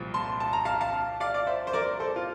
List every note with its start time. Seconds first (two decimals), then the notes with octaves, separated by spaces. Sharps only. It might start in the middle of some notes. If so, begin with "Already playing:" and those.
Already playing: C2 A#2 F3
0.14 A5 C6
0.40 A5
0.53 A#5
0.65 F5 A5
0.81 F5 A5
1.20 D5 F5
1.34 D5
1.47 C5 E5
1.67 C5
1.73 A#4 D5
2.00 A4 C5
2.16 F4